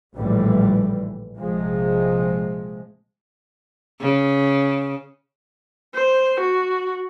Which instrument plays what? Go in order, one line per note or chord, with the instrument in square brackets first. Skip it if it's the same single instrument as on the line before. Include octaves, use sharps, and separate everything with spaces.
[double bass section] A#1 A2 D3 E3 G3
A#1 C3 F3 G#3
[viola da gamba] C#3
[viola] C5
F#4